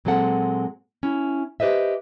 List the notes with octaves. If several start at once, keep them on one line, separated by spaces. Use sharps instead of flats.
A#2 F#3 G#3 C4 A4 F#5
C#4 E4
G4 B4 C5 D#5 E5